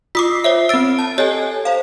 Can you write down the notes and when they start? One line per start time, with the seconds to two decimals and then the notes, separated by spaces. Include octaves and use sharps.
0.15 F4 D6 D#6 B6 C7
0.44 C5 C#5 E5
0.69 C4 E6 A6 D7
0.99 A5
1.18 G4 A4 C#5 D#5 G#5
1.65 C5 F5